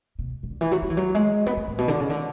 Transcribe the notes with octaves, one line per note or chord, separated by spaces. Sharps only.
B2
E3
D3
E3
F#3
F#3
E3
F#3
G#3
B3
G#3
A2
B2
D3
C#3
D3